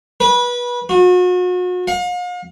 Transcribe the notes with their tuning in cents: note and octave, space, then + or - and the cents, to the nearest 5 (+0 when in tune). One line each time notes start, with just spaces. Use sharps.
B4 -25
F#4 -40
F5 +40